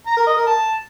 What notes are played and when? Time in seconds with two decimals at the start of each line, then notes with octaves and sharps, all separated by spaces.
0.07 A#5
0.17 A#4
0.27 D#5
0.37 A#4
0.47 A5